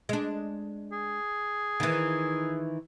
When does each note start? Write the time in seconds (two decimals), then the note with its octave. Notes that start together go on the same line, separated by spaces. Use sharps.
0.09 G#3 D4
0.92 G#4
1.80 D#3 E3